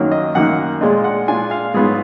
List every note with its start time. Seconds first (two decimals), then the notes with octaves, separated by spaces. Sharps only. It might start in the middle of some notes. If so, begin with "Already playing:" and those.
Already playing: F#2 D#3 F#3 A#3
0.12 D#5
0.35 F#2 D#3 F#3 A#3 F#5
0.81 A#2 G#3 D4 F4 D#5
1.04 F#5
1.28 A#2 G#3 D4 F4 G#5
1.51 F5
1.74 G#2 F#3 B3 F4 G#4